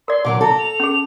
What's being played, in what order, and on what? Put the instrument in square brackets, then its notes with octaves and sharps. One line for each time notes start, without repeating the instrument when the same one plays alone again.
[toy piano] A#4 D5 [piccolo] C6
[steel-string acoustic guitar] A#2 D3 F#3 [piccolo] D6
[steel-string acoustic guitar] A4 [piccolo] A#5
[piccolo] F7
[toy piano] C#4 G#4